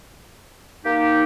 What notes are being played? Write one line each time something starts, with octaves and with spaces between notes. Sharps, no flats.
A#3 D#4 G4